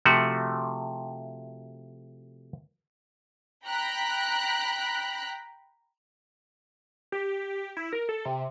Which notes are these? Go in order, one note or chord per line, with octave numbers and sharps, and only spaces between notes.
C3 F3 A3 F#4
G5 A#5 B5 F#6
G4
E4
A#4
A4
C3